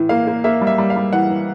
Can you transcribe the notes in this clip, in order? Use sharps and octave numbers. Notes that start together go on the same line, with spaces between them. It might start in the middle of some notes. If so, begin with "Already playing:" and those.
Already playing: A2 E3
A#3 F5
A#3
A#3 E5
G3
E5
G3
F5
G3
E3 F#5
E3